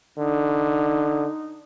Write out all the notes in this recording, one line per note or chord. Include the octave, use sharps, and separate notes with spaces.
D3 D#4